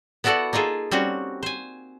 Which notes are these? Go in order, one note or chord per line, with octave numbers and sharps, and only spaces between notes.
B3 E4 F#4 A4 D5 F#5
A#3 D#4 F4 G#4 A4
G3 C4 C#4 F#4
C5 G#5